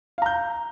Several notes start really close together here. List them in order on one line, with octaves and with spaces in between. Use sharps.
F5 A#5 G6